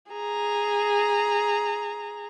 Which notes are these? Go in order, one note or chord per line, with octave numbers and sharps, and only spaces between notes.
G#4 A#5